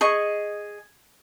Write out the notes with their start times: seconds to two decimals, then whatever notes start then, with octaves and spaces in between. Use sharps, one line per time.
0.01 G#4 D#5 C#6